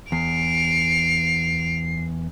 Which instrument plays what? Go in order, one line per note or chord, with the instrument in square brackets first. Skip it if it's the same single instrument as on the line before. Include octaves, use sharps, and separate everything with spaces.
[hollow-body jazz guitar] E2 [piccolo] C7 [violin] D7 F7